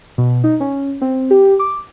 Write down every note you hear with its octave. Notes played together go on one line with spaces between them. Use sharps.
B2
D#4
C#4
C4
G4
D6